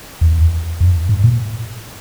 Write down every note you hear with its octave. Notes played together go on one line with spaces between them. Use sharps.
E2
F2
G#2
A#2